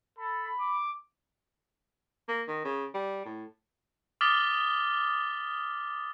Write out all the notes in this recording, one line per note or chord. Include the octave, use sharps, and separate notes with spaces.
A4 B5
D6
A#3
D#3
C#3
G3
A2
D6 D#6 F6 A6 B6 G7